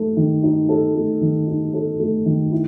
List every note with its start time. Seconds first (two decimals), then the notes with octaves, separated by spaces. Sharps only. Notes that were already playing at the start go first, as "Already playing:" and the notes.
Already playing: A3 D#4 A4
0.17 D#3
0.43 D#4
0.69 A4
0.95 A3
1.21 D#3
1.47 D#4
1.74 A4
2.00 A3
2.26 D#3
2.52 E4